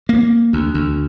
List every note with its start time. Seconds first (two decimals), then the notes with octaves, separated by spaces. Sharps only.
0.09 A#3
0.53 D2
0.74 D2